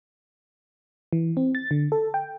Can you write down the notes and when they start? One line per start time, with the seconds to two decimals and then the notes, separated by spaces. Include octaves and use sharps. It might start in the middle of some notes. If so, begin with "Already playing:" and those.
1.13 E3
1.37 C4
1.55 A6
1.71 D3
1.92 A4
2.14 G5